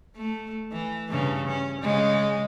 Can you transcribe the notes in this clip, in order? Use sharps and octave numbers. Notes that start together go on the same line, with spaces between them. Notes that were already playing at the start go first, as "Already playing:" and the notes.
A3
E3
G2 C#3 E3
C#4
C#3 G#3